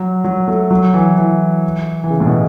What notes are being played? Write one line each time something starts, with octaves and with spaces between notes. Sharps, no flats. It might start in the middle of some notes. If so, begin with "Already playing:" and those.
Already playing: F#3
F#3
A3
F#3
E3
E3
E3
C#3
A2
B2